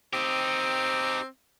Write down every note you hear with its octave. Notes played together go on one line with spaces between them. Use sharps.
C4 D#4 G4